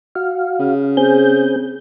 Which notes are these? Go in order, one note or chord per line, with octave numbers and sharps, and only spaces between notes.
F#4 F5
C#3
C4 G#4 G6